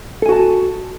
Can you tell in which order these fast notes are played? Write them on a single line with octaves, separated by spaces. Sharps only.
A4 G#5 F#4 A5